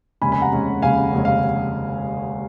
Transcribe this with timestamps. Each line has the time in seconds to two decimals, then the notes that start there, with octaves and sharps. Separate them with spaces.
0.21 F1 D#2 C#3 G#3 C#4 G#5 B5
0.32 G#5 B5
0.42 F#5 A#5
0.52 F1 D#2 C#3 G#3 C#4
0.82 F1 D#2 C#3 G#3 C#4 F5 G#5
1.13 F1 D#2 C#3 G#3 C#4
1.25 F5